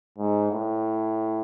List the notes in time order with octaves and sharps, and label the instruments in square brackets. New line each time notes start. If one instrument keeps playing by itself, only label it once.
[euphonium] G#2
A2